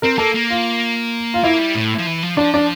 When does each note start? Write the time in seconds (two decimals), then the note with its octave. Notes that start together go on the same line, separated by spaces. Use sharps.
0.02 C4 A#4
0.18 A#3 A4
0.34 A#3
0.50 F4
1.34 F4
1.44 A#3 E4
1.59 G3
1.75 A2
1.98 F3
2.06 E3
2.23 F3
2.37 F3 D4
2.54 D4